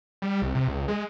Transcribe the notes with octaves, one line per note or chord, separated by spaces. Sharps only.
G3
C2
C3
C#2
G#3